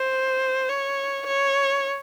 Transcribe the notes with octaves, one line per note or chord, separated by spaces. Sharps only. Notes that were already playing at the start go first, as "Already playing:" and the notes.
Already playing: C5
C#5
C#5